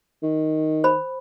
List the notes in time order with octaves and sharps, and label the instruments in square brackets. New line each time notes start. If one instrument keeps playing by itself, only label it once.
[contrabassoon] D#3
[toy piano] C5 B5